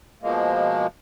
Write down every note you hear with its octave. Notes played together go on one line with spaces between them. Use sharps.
B2 F3 G#3 A#3